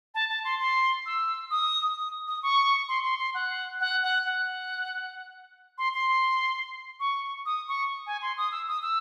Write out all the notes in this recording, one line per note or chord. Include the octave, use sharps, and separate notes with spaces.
A5
A5
C6
C6
E6
D#6
D#6
D#6
C#6
C6
C6
C6
F#5
F#5
F#5
F#5
C6
C6
C#6
D#6
C#6
G#5
C6
D#6
E6
D#6
E6